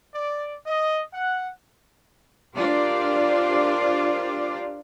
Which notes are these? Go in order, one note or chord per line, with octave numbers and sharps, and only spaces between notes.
D5
D#5
F#5
D4 F4 G4 A#4 C5 D5